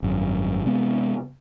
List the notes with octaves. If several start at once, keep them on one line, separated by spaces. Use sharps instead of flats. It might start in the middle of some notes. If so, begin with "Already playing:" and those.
G#1 F#2
C3 G#3 B3